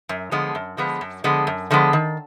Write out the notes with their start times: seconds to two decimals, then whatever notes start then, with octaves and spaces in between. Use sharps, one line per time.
0.09 F#2
0.31 D3 F3 G#3 B3
0.55 F#2
0.77 D3 F3 G#3 B3
1.01 F#2
1.24 D3 F3 G#3 B3
1.47 F#2
1.71 D3 F3 G#3 B3
1.93 D#3